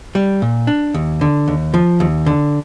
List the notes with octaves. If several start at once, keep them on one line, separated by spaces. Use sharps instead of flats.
G3
A#2
D4
D#2
D3
D#2
F3
D#2
D3